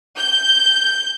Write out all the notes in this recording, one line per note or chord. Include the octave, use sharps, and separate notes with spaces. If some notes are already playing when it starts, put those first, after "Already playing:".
G6